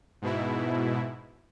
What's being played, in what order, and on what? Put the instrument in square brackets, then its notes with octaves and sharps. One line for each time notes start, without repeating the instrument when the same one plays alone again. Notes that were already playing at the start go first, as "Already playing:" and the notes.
[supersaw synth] G#2 B2 E4